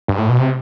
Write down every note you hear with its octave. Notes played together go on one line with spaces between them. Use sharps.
G2
A2
B2
C3